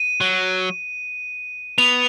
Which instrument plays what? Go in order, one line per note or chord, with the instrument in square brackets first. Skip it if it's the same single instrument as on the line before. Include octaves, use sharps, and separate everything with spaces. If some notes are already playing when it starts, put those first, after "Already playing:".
Already playing: [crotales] D#7
[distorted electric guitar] F#3
[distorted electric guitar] B3 [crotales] F7